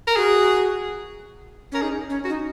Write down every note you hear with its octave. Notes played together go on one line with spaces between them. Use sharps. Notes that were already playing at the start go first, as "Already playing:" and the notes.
A#4
F#4 G#4
C#4 A#4
D#4 G#4
C#4
F#4
D#4